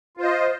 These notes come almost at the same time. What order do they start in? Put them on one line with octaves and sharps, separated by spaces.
F4 C5 D#5